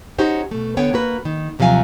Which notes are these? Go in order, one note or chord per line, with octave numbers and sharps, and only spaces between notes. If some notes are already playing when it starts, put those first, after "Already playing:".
C#4 D#4 F#4 G4 C5
B2 A3
D3 B3 C#5 G5
A#3 F#4 B4
D#3
D#2 C3 F3 F#3 F5 G#5